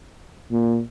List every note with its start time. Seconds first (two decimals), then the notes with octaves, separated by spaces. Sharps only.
0.51 A#2